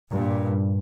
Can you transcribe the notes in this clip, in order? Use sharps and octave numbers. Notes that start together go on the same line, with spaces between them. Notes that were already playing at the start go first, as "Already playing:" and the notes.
G2 A#2